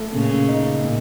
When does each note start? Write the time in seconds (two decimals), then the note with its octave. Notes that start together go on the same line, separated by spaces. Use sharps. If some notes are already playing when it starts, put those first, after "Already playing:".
Already playing: A3
0.14 A#2 C#3
0.48 D#4
0.84 A#2